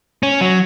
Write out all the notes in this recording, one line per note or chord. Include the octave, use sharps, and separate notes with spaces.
C#4
F#3